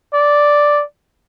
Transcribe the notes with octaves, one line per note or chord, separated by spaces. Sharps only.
D5